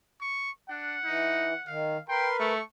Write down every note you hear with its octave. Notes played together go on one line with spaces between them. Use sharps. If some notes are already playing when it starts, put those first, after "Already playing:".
C#6
D4 F#5
E3 D#4
D#3 F5
A#4 B4 G5 C6
A3 C#6